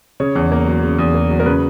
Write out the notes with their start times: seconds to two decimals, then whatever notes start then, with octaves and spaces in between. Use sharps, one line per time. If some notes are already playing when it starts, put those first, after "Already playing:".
0.20 C#3 C#5
0.35 E2
0.52 A#3
0.67 F#3
0.83 C#3
0.99 E2
1.14 A#3
1.30 F#3
1.40 A#4
1.46 C#3 B4